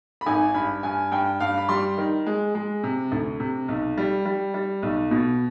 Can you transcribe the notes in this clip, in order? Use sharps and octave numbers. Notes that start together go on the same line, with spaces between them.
B5
G#1 G#5
G2 B5
G2 G#5
G2 G5
G2 F5
B5
G3 C6
D#3
G#3
G#3
C3
D2
C3
B1
G3
G3
G3
B1
B2